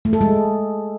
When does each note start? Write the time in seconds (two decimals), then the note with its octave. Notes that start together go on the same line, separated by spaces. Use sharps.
0.05 A3
0.13 A4
0.21 G#3